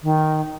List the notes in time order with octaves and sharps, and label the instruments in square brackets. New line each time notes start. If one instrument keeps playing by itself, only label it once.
[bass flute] D#3